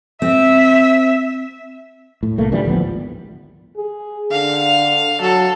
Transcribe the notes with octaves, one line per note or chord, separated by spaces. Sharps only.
C4 E5
A2
C2 A3 A#3
A#2 D3 E3 G3
D1 G#1 F3 B3
G#4
D3 F5
F#3 A4